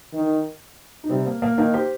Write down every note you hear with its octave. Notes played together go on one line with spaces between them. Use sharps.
D#3
D#4
C3 G3 C4
A#3
A#3
D#3 A#3 D#4
G4 C5